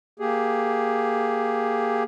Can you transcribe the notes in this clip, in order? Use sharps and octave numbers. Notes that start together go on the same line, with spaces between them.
A#3 G4 G#4